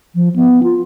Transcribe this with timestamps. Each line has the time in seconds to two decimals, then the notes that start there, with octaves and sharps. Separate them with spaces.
0.15 F3
0.36 B3
0.63 F4